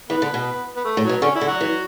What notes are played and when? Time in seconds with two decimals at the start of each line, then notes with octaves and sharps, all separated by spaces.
0.09 E3 B3
0.22 D3
0.34 B2
0.76 B3
0.85 A3
0.97 A2
1.04 F#3
1.09 B2
1.22 D3 C#4
1.35 E3 E4
1.41 D3
1.47 F#3 F#4
1.61 E3